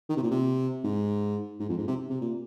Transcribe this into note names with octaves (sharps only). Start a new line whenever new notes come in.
D#3
C3
A#2
C3
G#2
G#2
F2
G#2
C3
C3
A#2